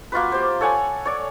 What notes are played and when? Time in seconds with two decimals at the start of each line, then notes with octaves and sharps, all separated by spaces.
0.12 A#3 F4 F#4 B4
0.32 G4 C5
0.61 A4 C#5 F#5 G#5
1.05 C#5 D5